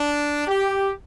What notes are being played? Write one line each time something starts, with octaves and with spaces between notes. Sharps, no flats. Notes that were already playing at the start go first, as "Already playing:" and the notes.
Already playing: D4
G4